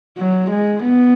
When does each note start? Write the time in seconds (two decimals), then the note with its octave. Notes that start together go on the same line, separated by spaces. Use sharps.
0.18 F#3
0.51 G#3
0.83 B3